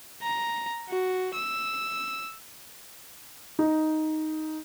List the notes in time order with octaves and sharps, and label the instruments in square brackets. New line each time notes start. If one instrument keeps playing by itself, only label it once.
[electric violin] A#5
F#4
E6
[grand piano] D#4